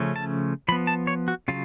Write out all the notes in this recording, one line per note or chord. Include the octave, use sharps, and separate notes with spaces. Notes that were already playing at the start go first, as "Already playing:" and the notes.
Already playing: C#3 F3 A3 C#4
A5
F3 B3 B5
A5
C#5
F#4
C#3 F#3 F4